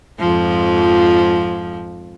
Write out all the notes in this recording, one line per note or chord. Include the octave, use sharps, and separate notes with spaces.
F2 G#2 F3